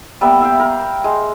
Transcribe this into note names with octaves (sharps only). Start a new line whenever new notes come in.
G3 A#3 B3 E5
E5 F5 G5
A#4
G#3